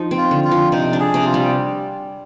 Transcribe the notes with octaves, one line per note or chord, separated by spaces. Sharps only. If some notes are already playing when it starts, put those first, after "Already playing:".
Already playing: F3 D#4
C4
F4
D3
F4
F3
C3 D#4
D4
G#4
C3
F4
G3